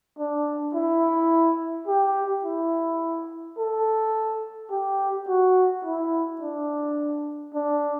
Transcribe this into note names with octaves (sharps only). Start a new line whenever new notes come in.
D4
E4
G4
E4
A4
G4
F#4
E4
D4
D4